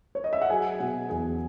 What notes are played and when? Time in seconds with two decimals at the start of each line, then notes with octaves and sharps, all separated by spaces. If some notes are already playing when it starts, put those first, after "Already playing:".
0.15 C#5
0.24 D#5
0.33 E5
0.41 F#5
0.50 F#3 G#4 G#5
0.80 B2 F#4 F#5
1.10 E2 G#4 G#5